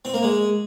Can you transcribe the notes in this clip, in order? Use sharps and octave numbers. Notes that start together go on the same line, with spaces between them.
C4
A#3
G#3